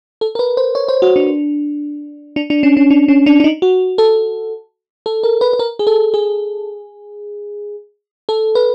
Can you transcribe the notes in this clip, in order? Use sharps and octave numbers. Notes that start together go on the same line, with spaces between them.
A4
A#4
B4
C5
C#5
C5
F#4
D4
D4
D4
C#4
C#4
D4
C#4
D4
D4
D#4
F#4
A4
A4
A#4
B4
B4
A#4
G#4
A4
G#4
A4
B4